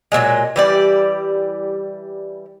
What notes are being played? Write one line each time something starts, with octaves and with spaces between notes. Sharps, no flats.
A#2 C#3 F#3 G#3
E3 G3 D5